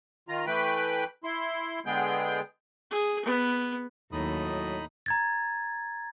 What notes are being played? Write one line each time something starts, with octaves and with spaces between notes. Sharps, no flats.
D#3 F4 A#5
E3 A3 B4 G5 B5
E4 C6
D3 G#3 B3 G#4 G5 G6
G#4
B3
D#2 A2 F#3 D#4 B5 D#6
A#5 G#6 A6